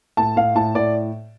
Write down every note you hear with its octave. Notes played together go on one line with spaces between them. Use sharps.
A2 A5
A2 F5
A2 A5
A2 D5